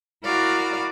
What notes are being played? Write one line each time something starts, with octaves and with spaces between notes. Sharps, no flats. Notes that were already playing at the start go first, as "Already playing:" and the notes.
E4 F#4 A#4 D5 F5